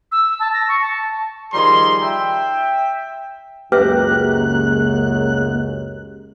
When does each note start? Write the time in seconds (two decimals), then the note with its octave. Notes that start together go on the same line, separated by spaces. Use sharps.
0.12 E6
0.40 A5
0.54 A#6
0.68 C#6
0.81 A5
1.53 D#3 F3 G3 G#4 A#5 C6
2.02 E5 G5
3.72 C#2 F#2 A#3 G4 B4 E5 F#6